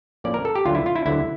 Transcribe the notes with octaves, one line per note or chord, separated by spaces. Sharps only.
A2 F3 A#3 C#4 D5
A#4
A4
G4
D2 D3 F#3 F4
E4
F4
E4
D2 D3 F#3 E4